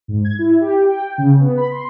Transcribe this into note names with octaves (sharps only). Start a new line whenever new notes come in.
G#2
G#6
E4
G4
G5
C#3
B3
B5
C6